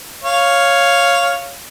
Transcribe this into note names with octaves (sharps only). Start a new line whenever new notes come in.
C#5 F5